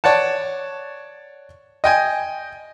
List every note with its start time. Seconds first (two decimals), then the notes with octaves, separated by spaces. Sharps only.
0.04 C#5 D5 F#5 A5
1.84 D#5 G5 G#5